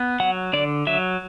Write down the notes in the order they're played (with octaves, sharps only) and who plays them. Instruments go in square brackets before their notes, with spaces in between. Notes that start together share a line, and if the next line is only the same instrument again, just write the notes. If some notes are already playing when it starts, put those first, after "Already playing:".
Already playing: [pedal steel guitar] B3
F#3 F#5
D3 D5
F#3 E5